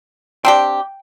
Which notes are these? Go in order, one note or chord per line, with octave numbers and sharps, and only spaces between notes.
C4 D4 G4 G5